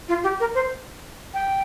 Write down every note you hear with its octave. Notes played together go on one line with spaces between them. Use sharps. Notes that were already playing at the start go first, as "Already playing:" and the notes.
F4
G4
A#4
C5
G5